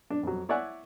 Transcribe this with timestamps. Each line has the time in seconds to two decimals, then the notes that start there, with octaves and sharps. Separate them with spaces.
0.10 D4
0.23 F2 F#3
0.49 E4 C#5 D5 E5 F#5 G#5